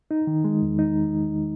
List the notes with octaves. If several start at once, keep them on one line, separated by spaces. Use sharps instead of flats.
D#4
D#3
G#3
E2
D#4